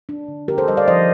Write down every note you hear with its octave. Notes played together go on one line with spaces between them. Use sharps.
D4
D3
D3 G4 A#4
A4 C5
G3 C5 D#5
D5 F5
F3 C5 D#5